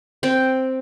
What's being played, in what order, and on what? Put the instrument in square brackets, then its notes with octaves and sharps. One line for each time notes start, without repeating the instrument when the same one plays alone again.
[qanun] C4 G5